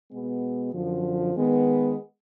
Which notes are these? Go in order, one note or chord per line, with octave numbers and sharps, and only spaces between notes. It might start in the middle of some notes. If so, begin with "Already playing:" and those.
B2 G#3 B3
F#2 D3 F3
D#3 G#3 B3